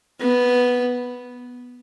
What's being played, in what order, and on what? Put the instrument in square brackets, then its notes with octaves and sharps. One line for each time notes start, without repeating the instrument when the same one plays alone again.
[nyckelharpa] B3